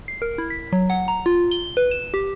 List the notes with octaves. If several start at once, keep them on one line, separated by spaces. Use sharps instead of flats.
C7
A#4
E4
B6
F#3
F#5
A#5
F4
G7
B4
E7
G4